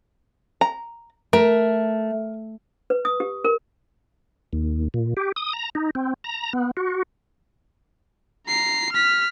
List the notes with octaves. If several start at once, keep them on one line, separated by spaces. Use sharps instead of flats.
A#5
A3 A#4
B4
D#6
G4
A#4
D#2
A#2
G4
D#6
A#5
D#4
C4
A#5
B3
F#4
A#5 C7
F6 B6